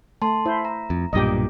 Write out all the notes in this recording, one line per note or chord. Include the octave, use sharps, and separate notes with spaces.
A3 A5 C6
E4 C5
A#5
F2
B1 G2 A#2 G4 D#5